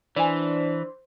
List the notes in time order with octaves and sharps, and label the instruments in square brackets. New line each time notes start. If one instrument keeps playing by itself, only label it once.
[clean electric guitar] E3 [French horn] D4 [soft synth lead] C5 [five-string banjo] D5 G#5